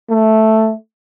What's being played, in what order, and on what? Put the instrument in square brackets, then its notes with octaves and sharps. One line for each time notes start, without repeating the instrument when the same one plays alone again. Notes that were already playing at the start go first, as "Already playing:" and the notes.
[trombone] A3